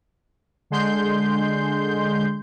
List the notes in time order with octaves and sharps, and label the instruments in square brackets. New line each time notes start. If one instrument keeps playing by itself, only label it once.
[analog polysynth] D3 G#3 C6 G6